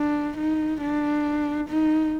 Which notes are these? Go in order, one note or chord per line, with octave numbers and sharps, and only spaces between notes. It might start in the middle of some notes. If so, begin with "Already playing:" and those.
Already playing: D4
D#4
D4
D#4